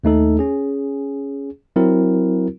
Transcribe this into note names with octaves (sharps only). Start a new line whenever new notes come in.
D#2 A3 D#4 A4
C#4 G#4
F#3 C4 E4 F#4 A#4